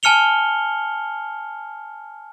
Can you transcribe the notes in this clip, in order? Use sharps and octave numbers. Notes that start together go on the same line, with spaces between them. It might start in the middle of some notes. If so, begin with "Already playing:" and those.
G#5 A5 F6 C#7 F7 G7